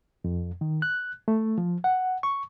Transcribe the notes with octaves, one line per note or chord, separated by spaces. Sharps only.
F2
D#3
F#6
A3
F3
F#5
C#6